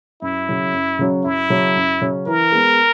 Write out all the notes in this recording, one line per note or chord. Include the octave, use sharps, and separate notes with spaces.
F#2 E4
C#3 F#3 C#4
F#2
C#3 F#3 C#4
F#2 E4
C#3 F#3 C#4
F#2
C#3 F#3 C#4
E3 A#4
G#3 B3